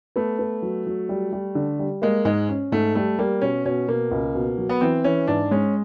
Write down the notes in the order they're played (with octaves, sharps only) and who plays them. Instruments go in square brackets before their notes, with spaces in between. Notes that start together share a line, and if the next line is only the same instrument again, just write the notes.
[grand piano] A3 [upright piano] B3
[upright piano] B3
F#3
F#3
G3
G3
D3
G3
[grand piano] G#3 [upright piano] A#3
[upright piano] G#2 [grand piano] G#3
[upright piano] C#4
[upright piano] G#2 [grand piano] A3
[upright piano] G3 [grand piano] A3
[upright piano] G3 [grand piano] A#3
[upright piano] B2 [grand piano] C#4
[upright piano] B2 [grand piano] C#4
[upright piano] B2 [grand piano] A#3
[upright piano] C#2
B2
F#3
[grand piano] B3
[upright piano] E3 [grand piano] C4
[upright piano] E3 [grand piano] C#4
[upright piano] G#2 [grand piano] D4
[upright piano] G#3 [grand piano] C#4